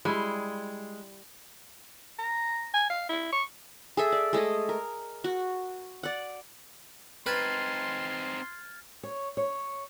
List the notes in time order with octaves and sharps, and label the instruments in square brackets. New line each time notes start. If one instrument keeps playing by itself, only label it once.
[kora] G3 E4 [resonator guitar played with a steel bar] G#3
[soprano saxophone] A#5
G#5
F5
E4
C#6
[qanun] G#4 A4 E5
D5
G#3 A3 G#4 D#5
A#4
F#4
D5 F#5
[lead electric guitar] C4 D#4 [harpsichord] B4 [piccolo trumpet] C6 [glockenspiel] F6 G#6 A6
[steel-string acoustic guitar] C#5
C#5